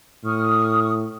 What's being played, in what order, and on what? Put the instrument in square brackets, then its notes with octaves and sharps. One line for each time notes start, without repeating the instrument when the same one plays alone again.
[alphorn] A2 [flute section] C#6 D#6 F6